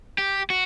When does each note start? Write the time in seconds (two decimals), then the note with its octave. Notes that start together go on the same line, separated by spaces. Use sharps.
0.18 G4
0.50 F#4